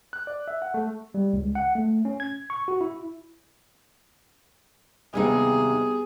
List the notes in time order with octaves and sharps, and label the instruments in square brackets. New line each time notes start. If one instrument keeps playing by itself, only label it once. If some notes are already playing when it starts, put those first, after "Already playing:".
[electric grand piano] F#6
D5
E5
F#5
A3
[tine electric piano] G3
C#2
F#5
A3
C#4
G#6
C#6
F#4
E4
[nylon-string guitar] D#2 C3 D#4 [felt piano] G3 B3 [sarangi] G#4